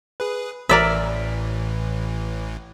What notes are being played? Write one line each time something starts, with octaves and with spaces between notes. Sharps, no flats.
G#4 B4
A1 A2 E3 A#4 D5 E5